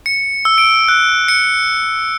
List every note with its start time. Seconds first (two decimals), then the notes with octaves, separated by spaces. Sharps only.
0.06 C#7
0.45 E6
0.58 D7
0.88 F#6
1.28 C#7